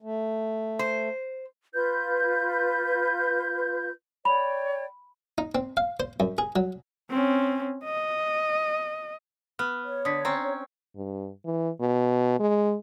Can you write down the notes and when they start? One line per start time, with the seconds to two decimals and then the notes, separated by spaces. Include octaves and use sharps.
0.02 A3
0.79 C5
1.74 F4 B4 G6
4.25 C#5 D5 G5 B5
5.38 D#4
5.55 C4
5.77 F5
6.00 C5
6.20 F#2
6.38 G#4
6.56 F#3
7.10 C4 C#4
7.84 D#5
9.59 B3 F6
9.84 C#5
10.05 D3 D#6 B6
10.25 C4 C#4 A#5
10.96 G2
11.45 E3
11.80 B2
12.40 G#3